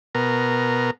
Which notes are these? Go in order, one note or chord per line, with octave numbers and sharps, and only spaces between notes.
B2 A#4